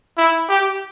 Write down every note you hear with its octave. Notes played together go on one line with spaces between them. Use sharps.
E4
G4